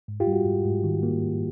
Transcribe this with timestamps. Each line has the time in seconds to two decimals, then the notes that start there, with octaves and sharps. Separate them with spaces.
0.08 G#2
0.20 F4 G4
0.27 G3
0.33 F#4
0.46 G#2
0.65 G#2
0.84 D#3
1.03 A#3